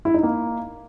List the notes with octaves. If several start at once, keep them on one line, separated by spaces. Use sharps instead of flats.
E4
D#4
A#3